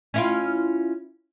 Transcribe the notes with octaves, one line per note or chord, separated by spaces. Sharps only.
C#4 E4 F4